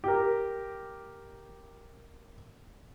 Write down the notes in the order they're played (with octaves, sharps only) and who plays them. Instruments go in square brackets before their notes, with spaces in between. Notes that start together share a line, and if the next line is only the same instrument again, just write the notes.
[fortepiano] G4 A#4